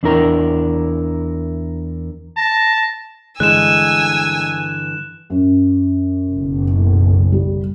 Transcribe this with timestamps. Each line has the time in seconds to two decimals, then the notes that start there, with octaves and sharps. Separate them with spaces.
0.03 E2 D4 E4 A#4 A#5
2.37 A5 A#6
3.40 G2 D3 E3 G#3 G#5 E6 F#6 E7
5.30 F#2
6.32 F#1 B1
7.32 G3